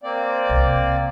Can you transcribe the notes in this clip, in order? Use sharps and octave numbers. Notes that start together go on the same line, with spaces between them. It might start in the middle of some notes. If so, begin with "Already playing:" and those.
A#3 C4 D5
C2